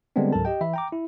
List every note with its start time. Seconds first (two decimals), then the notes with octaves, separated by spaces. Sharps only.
0.16 D3 G3 G#3 B3 C4 D4
0.33 C#2 G#2 F#3 A4 A#4 A5
0.45 G4 D#5 G5
0.61 E3 E5 B5
0.74 G5 A#5 D6
0.92 E4